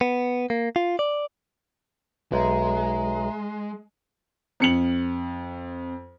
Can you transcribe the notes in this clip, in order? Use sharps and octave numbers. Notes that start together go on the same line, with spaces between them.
B3
A#3
F4
D5
B1 G#3 E5 A#5
F2 C#7 F#7